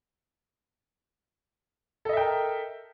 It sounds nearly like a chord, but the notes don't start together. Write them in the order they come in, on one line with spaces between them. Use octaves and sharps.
A4 D#5 E5 G5 A#4